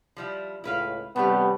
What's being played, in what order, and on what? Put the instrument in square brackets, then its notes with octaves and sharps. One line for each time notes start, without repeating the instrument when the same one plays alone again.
[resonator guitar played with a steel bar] F3 G3 E4
[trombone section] C#2 A2 [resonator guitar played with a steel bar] E4 B4 F5
[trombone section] A1 C3 G3 [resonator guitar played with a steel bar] A3 D4 G4 [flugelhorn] B3